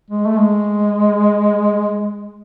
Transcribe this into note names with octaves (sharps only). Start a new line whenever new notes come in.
G#3
A3
G#3